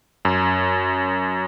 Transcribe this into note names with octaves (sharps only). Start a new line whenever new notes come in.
F#2